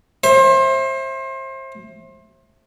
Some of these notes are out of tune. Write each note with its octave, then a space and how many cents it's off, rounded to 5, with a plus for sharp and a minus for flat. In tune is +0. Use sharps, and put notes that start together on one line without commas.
C5 +30 E5 +0